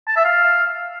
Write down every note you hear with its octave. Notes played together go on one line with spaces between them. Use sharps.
A5
E5
F5